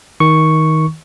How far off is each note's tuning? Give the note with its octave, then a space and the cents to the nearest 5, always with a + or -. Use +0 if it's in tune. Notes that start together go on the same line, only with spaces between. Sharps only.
D#3 +20 C#6 +0